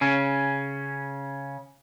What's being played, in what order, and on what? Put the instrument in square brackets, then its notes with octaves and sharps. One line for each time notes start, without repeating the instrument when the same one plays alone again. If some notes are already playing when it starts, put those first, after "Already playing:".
[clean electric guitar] C#3 C#4